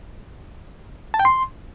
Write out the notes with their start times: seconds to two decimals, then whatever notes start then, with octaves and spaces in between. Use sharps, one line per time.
1.14 A5
1.20 G5
1.25 C6